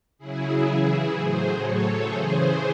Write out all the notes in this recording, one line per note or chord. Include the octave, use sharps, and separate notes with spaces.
C#3 F#3 E4 G#4
C#3 E3 E4 G#4
A2 F#3 G#4 C5
A2 F#3 A4 C#5
C#3 E3 G#4 C5